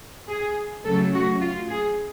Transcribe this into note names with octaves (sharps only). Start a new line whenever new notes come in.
G#4
C#3 F#3 A3 A4
F#4
F4
G#4